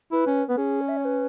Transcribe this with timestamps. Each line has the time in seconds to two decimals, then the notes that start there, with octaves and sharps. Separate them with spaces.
0.12 E4 B4
0.27 C#4
0.48 B3 B4
0.58 C#4 G#4
0.81 C#5
0.88 E5
0.97 C#5
1.05 B4